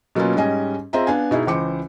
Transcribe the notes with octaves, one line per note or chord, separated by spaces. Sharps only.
B2 F#3 A#3 B3 C#4 F4
G#2 G3 C#4 D#5 G#5
C4 F4 G#4 D#5 E5 A#5
B3 D4 F5 G#5
B2 D#4 E4 G#4
C#2 E3 C5 D6 C#7